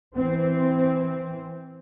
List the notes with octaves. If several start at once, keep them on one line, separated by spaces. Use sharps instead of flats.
E3 C4